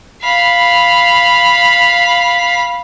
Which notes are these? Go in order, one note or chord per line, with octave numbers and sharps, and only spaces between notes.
F5 B5